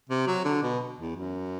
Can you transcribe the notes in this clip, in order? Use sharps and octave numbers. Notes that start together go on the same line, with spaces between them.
C3
F#3
D3
B2
E2
F#2